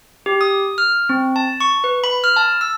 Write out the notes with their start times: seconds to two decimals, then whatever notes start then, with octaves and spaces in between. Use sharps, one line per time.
0.26 G4
0.41 D#6
0.78 F6
1.09 C4
1.36 A5
1.60 C#6
1.84 B4
2.04 B5
2.24 F6
2.36 A5
2.61 E6